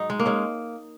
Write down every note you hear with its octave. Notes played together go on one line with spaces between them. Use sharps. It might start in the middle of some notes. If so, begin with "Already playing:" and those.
Already playing: G#2 F#3 D#4
G#3
A#3
G#3 C#4